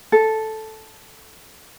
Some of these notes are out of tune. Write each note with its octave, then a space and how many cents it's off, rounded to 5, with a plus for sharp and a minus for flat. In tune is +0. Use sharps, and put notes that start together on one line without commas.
A4 -5